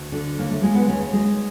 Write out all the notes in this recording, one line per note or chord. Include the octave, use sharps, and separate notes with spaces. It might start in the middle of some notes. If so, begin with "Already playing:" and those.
Already playing: D2
D3
D#2 A#3
A3
G#3 A#3
B3
D#2 C#4
G#3